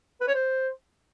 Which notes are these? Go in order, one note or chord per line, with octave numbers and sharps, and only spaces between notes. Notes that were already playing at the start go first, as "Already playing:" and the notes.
B4
C#5
C5